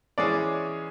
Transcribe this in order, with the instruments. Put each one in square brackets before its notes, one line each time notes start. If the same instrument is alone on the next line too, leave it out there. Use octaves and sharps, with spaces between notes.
[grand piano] E3 G#3 C#4 G#4 C#5 [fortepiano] D5